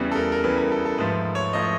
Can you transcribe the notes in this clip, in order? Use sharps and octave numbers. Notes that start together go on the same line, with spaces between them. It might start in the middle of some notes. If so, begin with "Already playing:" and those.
Already playing: E2 C#3 E3 G3
A4
A#4
A#4
E2 C#3 E3 G3 B4
A#4
A4
A4
G#2 F3 A3 B4
C#5
F3 A3 D#5